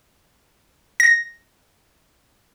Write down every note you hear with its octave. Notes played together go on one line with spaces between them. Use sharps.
A#6